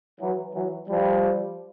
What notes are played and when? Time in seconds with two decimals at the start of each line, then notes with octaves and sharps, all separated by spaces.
0.20 E3 F#3
0.54 E3 F#3
0.88 F3 G3